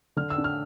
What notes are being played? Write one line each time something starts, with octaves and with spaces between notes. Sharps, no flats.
D3 F6
E6
D4
F6